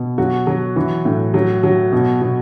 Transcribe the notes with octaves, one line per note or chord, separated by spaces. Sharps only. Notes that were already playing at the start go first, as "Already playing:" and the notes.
Already playing: B2
F#3 F#4
F#3
E3
A2
F#3
F#3
B2
B2